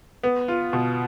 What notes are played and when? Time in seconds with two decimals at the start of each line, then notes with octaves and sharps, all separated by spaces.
0.23 B3
0.48 F4
0.73 B2